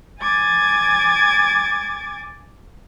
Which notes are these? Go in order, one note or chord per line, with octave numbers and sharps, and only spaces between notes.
G#5 D6 G#6 A6